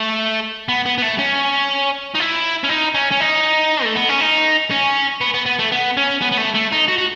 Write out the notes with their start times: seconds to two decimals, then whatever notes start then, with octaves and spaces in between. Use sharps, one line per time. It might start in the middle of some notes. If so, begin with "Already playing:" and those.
Already playing: A3
0.69 B3
0.86 B3
0.98 B3
1.02 A3
1.19 C#4
2.15 D#4
2.20 E4
2.64 C#4
2.69 D#4
2.94 C#4
3.11 C#4
3.20 D#4
3.84 A3
3.96 B3
4.09 C#4
4.20 D#4
4.71 C#4
5.21 B3
5.34 B3
5.46 B3
5.59 A3
5.72 B3
5.97 C#4
6.22 B3
6.32 B3
6.38 A3
6.55 A3
6.72 D#4
6.88 F#4
6.98 F#4